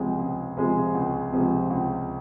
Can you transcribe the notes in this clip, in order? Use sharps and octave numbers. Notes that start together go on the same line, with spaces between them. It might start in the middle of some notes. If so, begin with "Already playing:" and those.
Already playing: C#2 C3 F3 G#3
C#2
C3 F3 G#3
C#2
C3 F3 G#3
C#2